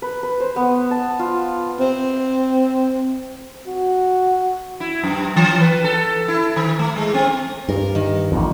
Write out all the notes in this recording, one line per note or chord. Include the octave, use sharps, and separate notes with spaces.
B4
B4
C5
B3
A5
F4
C4
F#4
E4
F#2
E3
B4
A4
E4
D#3
A3
G#3
C4
G2 A#4
D#3
A1 F2